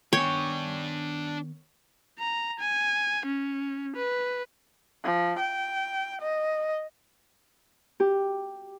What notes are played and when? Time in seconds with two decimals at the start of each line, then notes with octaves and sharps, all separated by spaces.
0.13 D#3 B3 D4 C#5 G5 G#5
2.19 A#5
2.60 G#5
3.26 C#4
3.96 B4
5.04 F3
5.40 G5
6.21 D#5
8.00 G4